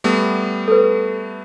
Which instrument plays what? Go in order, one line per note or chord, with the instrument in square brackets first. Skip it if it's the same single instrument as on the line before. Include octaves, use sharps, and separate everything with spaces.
[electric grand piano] G3 A3 B3
[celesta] A4 B4